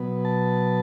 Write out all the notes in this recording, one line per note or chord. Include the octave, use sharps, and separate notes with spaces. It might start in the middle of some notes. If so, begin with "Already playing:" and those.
Already playing: B2 F#3 B3
A5